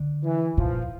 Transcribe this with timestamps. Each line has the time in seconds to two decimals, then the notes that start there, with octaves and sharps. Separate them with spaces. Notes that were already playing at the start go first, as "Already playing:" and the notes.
Already playing: D3
0.23 E3
0.57 A#2 F3